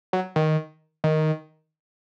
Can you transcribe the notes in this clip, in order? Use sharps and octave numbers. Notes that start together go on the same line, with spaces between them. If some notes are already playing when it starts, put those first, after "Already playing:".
F#3
D#3
D#3